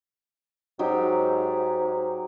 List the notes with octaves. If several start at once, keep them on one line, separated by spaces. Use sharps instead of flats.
G#2 F#3 D#4 G4